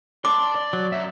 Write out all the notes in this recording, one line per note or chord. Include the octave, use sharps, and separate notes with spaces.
D5 A5 C6 D6
D5
F#3
F#2 E5